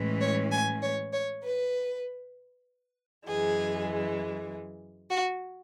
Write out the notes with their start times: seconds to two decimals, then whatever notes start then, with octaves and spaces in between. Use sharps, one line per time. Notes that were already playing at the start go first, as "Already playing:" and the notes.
Already playing: A2 E3 G#3 C#4
0.20 C#5
0.51 G#5
0.82 C#5
1.13 C#5
1.43 B4
3.26 F#2 E3 G#3 G#4
5.10 F#4